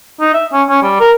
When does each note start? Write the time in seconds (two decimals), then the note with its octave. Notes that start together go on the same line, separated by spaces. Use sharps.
0.21 D#4
0.34 E5
0.53 C#4
0.69 C#4
0.82 G3
1.00 A#4